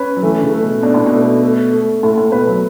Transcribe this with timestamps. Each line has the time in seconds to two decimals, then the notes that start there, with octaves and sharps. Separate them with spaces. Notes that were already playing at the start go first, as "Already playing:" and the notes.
Already playing: C#4 B4
0.17 F#3
0.22 E3 A3
0.38 D3
0.43 C#3
0.53 A3
0.63 B2
0.83 B2 D4
0.94 A2
1.06 B2
1.12 A3
1.43 A3
1.72 A3
2.03 A2 A3
2.18 A2
2.32 B2 B4
2.48 F#3